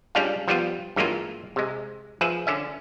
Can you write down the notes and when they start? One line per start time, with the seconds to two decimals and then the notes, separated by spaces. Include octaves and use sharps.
0.15 G3 G#3 C#4 D4 F4 F5
0.48 F3 G3 B3 F4
0.96 G2 E3 F#3 G#3 A#3 F4
1.56 C3 G#3
2.21 F3 G#4 B4 E5
2.47 D3 C#4 E5